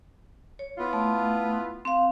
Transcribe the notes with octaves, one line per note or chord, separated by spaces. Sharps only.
C#5
B3 E4 F4
A3
C4 F5